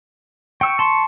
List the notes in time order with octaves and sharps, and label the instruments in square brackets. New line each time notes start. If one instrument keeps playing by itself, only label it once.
[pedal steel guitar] G5 E6 [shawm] C#6
[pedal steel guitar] A5 C6